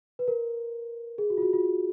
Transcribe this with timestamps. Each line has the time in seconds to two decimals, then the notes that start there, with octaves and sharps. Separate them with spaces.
0.19 B4
0.28 A#4
1.18 G#4
1.30 F#4
1.37 F4
1.42 F#4
1.53 F4